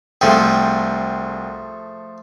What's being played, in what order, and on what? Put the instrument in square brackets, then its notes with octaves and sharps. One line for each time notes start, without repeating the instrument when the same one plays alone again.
[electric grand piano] C2 G5 [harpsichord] F3 A3 G#4